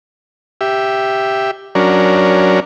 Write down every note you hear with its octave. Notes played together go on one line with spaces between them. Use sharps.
G4 E5
F#3 C#4 D4 A#4